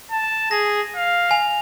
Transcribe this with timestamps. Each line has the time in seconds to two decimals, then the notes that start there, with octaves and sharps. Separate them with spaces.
0.11 A5
0.51 G#4 A#6
0.96 F5
1.30 G#5 F7